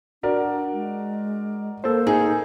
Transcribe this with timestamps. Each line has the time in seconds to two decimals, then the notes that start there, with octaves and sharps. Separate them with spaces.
0.23 D4 F#4 A#4 D5
0.73 G#3
1.84 A#3 A4 C5
2.07 D#4 G#4